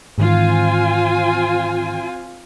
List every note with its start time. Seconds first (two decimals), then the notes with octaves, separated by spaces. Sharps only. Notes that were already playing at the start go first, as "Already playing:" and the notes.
0.18 G#2 D#3 E3 C4 F4 G#5